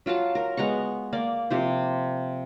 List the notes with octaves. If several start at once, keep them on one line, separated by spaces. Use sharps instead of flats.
F#3 F4 F#4 A5
A#4
G#3 B3 A#5 C#6
A#3 D5
C3 F3 C5